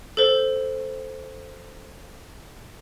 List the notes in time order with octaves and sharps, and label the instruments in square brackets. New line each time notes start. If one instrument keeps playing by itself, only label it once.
[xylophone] A4 C5